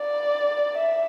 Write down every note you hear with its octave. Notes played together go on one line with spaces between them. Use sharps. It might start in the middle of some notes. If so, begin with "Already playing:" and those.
Already playing: D5
E5